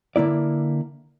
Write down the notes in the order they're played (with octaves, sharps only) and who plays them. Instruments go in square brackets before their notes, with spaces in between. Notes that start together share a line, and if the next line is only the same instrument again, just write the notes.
[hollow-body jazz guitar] D3 A#3 E4 D5